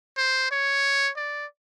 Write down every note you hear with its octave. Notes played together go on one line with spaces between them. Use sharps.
C5
C#5
D5